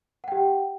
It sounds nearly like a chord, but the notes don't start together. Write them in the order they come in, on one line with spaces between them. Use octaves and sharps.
F#5 G5 G4